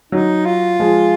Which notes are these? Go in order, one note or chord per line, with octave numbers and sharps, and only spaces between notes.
F#3 D#4
F4
F3 G#3